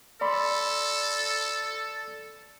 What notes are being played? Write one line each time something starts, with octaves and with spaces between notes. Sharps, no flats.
A4 D5 B5 C6